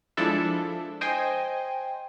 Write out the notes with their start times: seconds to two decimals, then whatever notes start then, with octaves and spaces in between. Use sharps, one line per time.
0.17 F3 G#3 D4 E4 A4 E5
1.01 C5 D#5 G5 G#5 C6